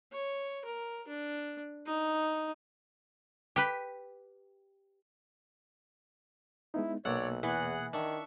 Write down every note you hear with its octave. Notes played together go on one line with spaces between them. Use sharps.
C#5
A#4
D4
D#4
G4 B4
G#3 B3 D#4 E4
B1 B2 A#3 C#5 D5 F#5 E6
E2 E3 G#4 F#5 F#6
D#3 D4 E5 C#6